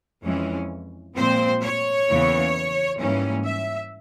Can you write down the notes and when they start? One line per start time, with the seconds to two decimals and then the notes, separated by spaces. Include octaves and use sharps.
0.23 F2 E3 G#3 C#4
1.15 A#2 F3 G#3 C4 C5
1.62 C#5
2.08 E2 C#3 E3 A#3
2.99 G#2 E3 G3 A#3 C#4
3.45 E5